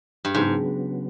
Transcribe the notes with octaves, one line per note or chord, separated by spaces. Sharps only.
G2
G#2 C#3 F#3 B3